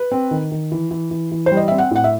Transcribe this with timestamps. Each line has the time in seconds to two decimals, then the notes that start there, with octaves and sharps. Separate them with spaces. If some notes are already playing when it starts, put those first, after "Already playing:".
Already playing: B4
0.12 C4
0.31 D#3
0.52 D#3
0.72 E3
0.91 E3
1.11 E3
1.32 E3
1.46 C5
1.52 G3
1.57 D#5
1.68 C4 E5
1.78 F#5
1.91 A2 F#5
2.04 E5